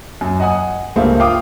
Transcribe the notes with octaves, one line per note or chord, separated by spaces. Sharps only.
F#2
D#5 F#5 G#5 D#6
C#2 G2 A3 A#3 C5
F4 F5 G5 D6 D#6